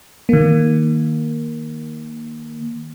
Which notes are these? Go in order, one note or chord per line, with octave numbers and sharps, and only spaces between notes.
D#3 A#3